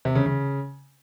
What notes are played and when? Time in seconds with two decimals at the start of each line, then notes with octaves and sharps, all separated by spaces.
0.05 C3
0.15 C#3
0.26 C#3